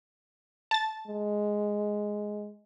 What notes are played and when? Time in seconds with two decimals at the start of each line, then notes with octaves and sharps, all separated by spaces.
0.71 A5 A6
1.07 G#3